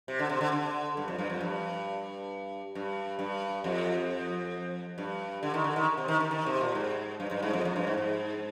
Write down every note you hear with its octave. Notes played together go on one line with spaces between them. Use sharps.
C3
D3
C3
D3
D3
G2
F2
G2
F2
G2
G2
G2
F2
G2
D3
D#3
D3
D#3
C3
D#3
D#3
D#3
C3
A#2
G#2
G2
G2
G#2
F2
F2
G2
G#2
G#2